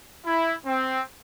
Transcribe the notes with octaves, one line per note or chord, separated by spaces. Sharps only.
E4
C4